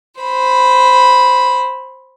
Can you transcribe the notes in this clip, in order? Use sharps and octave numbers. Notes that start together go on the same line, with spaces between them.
C5 B5